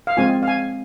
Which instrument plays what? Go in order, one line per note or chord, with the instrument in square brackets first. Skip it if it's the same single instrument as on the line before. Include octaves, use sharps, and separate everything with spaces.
[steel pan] F5
G#3 C4 F4 G#5
F5
G#5